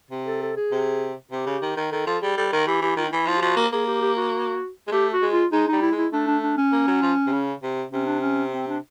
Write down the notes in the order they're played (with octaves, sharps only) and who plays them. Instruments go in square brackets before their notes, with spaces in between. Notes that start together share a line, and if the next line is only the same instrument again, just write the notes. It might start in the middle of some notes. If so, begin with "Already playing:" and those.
[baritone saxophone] C3
[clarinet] A4
A4
G#4
[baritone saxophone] C3
[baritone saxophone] C3 [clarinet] G4
[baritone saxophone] C#3
D#3
D#3
[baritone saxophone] D#3 [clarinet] A4
[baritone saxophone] F3 [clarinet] A4
[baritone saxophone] G3 [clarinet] G#4
[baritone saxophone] G3 [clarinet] A4
[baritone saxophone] D#3 [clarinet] A#4
[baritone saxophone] E3 [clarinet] G4
[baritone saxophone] E3 [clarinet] G4
[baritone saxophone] D#3 [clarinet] F4
[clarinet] D#4
[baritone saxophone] E3 [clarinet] E4
[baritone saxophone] F3
[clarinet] G4
[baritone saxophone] F3 [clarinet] F#4
[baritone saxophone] A#3
[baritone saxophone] A#3 [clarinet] G#4
[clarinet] G4
G4
F#4
[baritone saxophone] G#3
[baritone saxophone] A3 [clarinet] G4
[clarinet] F#4
[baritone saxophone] G#3
[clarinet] F4
[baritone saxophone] G#3 [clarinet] D#4
[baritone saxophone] G3 [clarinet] D#4
[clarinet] E4
[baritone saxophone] G#3
[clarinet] E4
[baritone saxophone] A3 [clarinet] D4
[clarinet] D4
D4
C#4
[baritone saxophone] A#3
F#3
F3
C3
C#3
C3
[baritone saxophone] C3 [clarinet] C#4
[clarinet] D4
C#4
C4
D4